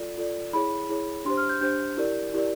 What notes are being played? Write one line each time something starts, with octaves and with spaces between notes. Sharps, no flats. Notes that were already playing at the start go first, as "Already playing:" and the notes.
Already playing: F4 A4 D5
F4 A4 D5
E4 G#4 C#5 B5
E4 G#4 C#5
D4 G4 C5 C6
F6
G6
D4 G4 C5 G6
E4 G4 A#4 D5
E4 G4 A#4 D5